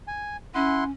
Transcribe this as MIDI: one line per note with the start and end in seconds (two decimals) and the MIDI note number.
0.07 0.37 80
0.55 0.90 61
0.55 0.84 64
0.55 0.84 78
0.55 0.84 84